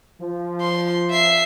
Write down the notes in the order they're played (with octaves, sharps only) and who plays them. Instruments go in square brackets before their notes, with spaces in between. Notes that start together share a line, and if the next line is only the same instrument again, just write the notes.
[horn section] F3
[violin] C6
E5 C7